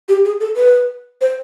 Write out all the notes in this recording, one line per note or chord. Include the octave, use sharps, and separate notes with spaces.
G4
G#4
A4
B4
C5